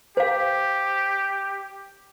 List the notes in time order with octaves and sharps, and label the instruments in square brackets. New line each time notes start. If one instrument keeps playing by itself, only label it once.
[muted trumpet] G4 [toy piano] C5 F5